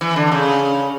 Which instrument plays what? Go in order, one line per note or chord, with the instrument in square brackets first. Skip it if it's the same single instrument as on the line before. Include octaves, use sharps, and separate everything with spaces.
[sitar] E3
D3
C#3